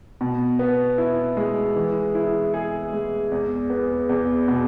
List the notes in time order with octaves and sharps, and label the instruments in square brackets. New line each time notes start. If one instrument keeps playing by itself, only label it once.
[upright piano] B2
B3
E4
G#3
E3
E4
G#4
G#3
E2
B3
E2
B2